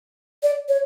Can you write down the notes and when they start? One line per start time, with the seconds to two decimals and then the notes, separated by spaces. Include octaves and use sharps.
0.43 D5
0.69 C#5